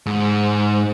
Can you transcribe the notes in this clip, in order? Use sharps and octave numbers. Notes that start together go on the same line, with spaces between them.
G#2